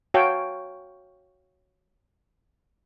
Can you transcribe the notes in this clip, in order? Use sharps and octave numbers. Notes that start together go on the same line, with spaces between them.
F#4 C#5 F5 G5 A5